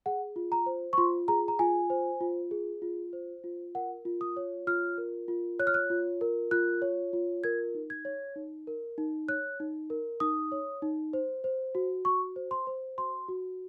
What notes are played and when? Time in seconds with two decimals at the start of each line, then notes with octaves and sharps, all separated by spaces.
0.06 G#4 F#5
0.36 F4
0.52 A#5
0.66 C5
0.93 C#6
0.98 F4 C6
1.28 G#4 A#5
1.48 A#5
1.59 F4 G#5
1.90 C5
2.21 F4
2.51 G#4
2.82 F4
3.13 C5
3.44 F4
3.75 A#4 F#5
4.05 F4
4.21 D#6
4.37 C#5
4.67 F4 F6
4.98 A#4
5.28 F4
5.59 C#5 F#6
5.67 F6
5.74 F#6
5.90 F4
6.21 A#4
6.51 F4 F#6
6.82 C#5
7.13 F4
7.44 A#4 G#6
7.75 D#4
7.90 G#6
8.05 C#5
8.36 D#4
8.67 A#4
8.98 D#4
9.28 C#5 F#6
9.60 D#4
9.90 A#4
10.20 D#4 D#6
10.52 C#5
10.82 D#4
11.13 C5
11.44 C5
11.75 F#4
12.05 F#4 C#6
12.36 C5
12.51 C6
12.67 C5
12.98 F#4 C6
13.28 F#4